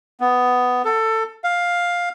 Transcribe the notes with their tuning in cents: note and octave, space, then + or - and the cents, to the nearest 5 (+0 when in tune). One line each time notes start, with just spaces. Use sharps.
B3 +10
A4 +20
F5 +10